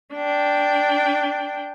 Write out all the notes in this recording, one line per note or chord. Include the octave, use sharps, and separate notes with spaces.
D4 G5